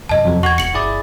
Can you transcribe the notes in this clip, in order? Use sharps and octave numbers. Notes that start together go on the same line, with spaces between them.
B1 F#2 C3 D#5 A5
F2 F#3
E2 F#4 C#6 G#6
E1 B2 C#7 F#7
G1 E4 G#4 D5